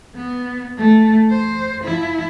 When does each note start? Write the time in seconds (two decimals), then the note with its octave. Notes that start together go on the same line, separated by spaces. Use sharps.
0.15 B3
0.78 A3
1.31 C5
1.83 F3 E4